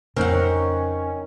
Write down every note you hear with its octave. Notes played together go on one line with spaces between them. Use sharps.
F2 C#3 C4 C#4 D#4 A#4 F#5